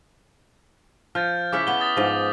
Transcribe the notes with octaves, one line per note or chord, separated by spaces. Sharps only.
F3 F6 G6 A6
C#3 E4 C#5 D6 F6 B6
B3 C#4 G7
D#6 A6
G#2 F3 A#6